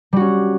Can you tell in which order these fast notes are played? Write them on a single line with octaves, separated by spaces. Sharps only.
G3 F#4 C#4